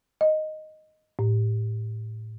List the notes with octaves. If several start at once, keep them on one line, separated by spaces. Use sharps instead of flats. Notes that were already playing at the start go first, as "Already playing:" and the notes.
D#5
A2